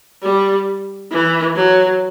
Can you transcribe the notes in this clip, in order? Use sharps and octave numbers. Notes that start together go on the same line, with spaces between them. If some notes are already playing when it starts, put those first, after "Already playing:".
G3
E3
F#3